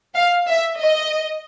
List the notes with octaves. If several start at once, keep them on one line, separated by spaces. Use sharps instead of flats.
F5
E5
D#5